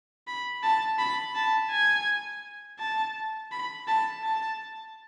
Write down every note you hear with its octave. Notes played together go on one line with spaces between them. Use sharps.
B5
A5
B5
A5
G#5
A5
B5
A5
A5